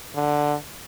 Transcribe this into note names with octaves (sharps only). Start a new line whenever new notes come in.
D3